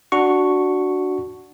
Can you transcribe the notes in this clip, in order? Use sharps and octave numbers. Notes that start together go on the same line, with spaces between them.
D4 F#4 C#6